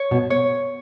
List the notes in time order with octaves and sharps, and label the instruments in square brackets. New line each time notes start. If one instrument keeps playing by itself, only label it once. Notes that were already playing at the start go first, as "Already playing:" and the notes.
Already playing: [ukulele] C#5
[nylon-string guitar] B2
[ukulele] C#5